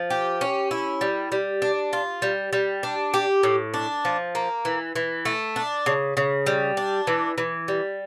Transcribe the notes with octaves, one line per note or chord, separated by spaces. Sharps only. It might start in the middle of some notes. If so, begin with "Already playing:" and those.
Already playing: F3
G4
C#4
E4
G3
G3
D4
F4
G3
G3
D4
G4
A2
D4
F3
A#3
E3
E3
A3
D4
C#3
C#3
G3
D4
E3
E3
G3